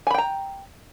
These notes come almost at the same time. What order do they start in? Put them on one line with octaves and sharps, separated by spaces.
G#5 B5 G5 A#5